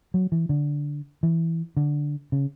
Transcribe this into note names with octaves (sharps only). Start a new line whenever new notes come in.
F#3
E3
D3
E3
D3
C#3